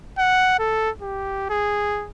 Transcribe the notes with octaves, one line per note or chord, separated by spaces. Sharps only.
F#5
A4
G4
G#4